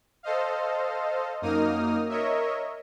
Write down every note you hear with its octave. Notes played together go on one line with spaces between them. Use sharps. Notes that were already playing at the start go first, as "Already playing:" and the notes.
A4 C5 D#5 F5
F#2 A#3 D#4 D#6 F6
A#4 C#5 D#5 E5